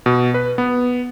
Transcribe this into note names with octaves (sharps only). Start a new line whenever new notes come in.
B2
B4
B3